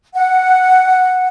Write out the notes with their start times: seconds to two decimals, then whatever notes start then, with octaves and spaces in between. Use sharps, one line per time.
0.14 F#5